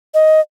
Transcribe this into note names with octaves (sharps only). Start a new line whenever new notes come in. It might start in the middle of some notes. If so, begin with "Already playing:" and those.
D#5